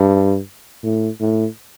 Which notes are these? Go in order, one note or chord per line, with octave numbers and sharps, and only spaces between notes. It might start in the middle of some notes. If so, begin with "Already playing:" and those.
Already playing: G2
A2
A2